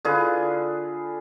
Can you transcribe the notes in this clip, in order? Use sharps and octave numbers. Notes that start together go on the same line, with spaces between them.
D3 F4 G#4 B4